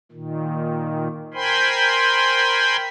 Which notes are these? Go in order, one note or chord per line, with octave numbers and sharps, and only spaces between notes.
A#2 D#3
A#4 C5 G5 G#5 B5 C6